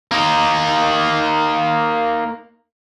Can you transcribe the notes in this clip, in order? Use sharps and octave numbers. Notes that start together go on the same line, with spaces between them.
A#3 D#4